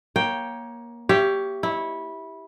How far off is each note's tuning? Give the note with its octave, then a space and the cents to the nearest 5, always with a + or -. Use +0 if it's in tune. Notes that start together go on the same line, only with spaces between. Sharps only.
A#3 +20 C#5 +0 G5 +0
G4 +0 C#5 +15 E5 +40
E4 -15 C#5 +0